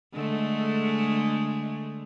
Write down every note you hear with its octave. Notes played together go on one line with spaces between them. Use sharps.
D3 G#3 A3